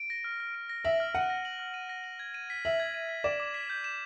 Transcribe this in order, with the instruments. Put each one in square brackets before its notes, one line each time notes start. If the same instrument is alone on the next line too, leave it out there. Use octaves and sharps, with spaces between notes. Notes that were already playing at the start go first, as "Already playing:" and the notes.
Already playing: [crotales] D7
A#6
F6
F6
D7
A#6
[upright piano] E5 [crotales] F#7
[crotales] F6
[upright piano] F#5 [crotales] D#7
[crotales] A#6
F#7
F6
D#7
A#6
F#7
G#6
D#7
B6
[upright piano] E5 [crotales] F#7
[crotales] G#6
D#7
B6
[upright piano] D5 [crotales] E7
[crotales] D6
B6
G6
E7